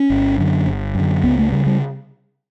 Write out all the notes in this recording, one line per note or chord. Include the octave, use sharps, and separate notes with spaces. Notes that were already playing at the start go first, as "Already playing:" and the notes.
Already playing: C#4
G1
F#2 D3
G1
F#2 D3
C#2 B3
A3
C#3 G3
G3